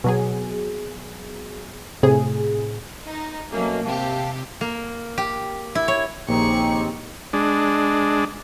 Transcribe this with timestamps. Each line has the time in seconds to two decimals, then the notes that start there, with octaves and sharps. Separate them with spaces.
0.04 B2 F#3 G#4
2.03 A2 C3 G#4
3.06 D#4
3.50 B2 F#3 A3 A#3 C#4
3.85 C3 G4 F5 A5
4.61 A#3
5.18 G4
5.75 E4
5.88 C#5
6.29 A#1 D#2 C4 D#4 G4 G#4 C#6
7.33 G#3 D4